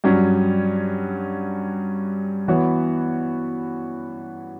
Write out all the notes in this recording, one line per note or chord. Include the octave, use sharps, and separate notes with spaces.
G2 F#3 C#4
E3 B3 F#4 C#5